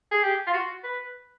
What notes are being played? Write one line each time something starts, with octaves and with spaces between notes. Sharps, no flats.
G#4
G4
F4
F#4
B4